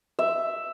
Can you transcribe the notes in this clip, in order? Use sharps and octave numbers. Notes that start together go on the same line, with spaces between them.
E5